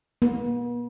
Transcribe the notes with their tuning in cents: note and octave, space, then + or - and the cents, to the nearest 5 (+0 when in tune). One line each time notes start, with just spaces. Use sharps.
B3 -45